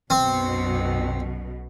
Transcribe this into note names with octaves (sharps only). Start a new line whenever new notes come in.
B1 F#2 B2 C4